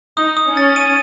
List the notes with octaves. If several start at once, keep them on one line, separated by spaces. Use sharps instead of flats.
D#4 D#6
D#6
C#4
A6
D#7